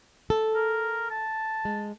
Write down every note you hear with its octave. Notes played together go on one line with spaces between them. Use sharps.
A4
A#4
A5
G#3